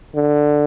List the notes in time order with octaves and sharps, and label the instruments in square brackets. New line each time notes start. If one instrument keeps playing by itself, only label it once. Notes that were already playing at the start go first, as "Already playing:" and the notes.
[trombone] D3